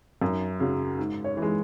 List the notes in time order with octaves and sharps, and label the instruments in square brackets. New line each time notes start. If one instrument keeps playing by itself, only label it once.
[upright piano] F#2
C#3 F#3
G#2
C#5
E3
G#3